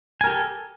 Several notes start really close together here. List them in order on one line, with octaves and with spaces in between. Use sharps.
G#5 A#4 G4 A4